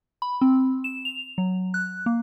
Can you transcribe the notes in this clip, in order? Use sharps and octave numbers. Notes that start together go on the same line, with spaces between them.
B5
C4
E7
F7
F#3
F#6
A#3